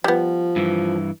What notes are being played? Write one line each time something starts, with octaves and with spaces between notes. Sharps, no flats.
F3 G3 B3
G2 E3